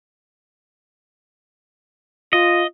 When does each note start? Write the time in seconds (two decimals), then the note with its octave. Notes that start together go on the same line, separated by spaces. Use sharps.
2.33 F4 D#5